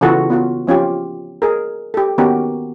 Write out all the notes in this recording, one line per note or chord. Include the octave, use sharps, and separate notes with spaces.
C#3 E3 F4 F#4 A4
B3 F4 F#4
F3 C#4 F4 G4
G#4 A#4
G4 A4
D#3 B3 C#4 F#4 G4 A#4